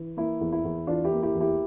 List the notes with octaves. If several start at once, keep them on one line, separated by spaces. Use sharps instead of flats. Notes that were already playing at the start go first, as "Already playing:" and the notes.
Already playing: E3
A#3 E4
E2
E4
E2
E3 D4 F4
E4 G4
A#3
E4 G4
E2
E4 G4